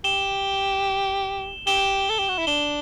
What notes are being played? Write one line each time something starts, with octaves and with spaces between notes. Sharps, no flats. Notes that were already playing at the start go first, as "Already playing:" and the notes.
G4 E7 G7
G4 E7 G7
A4
G4
F#4
E4
D4 E7 G7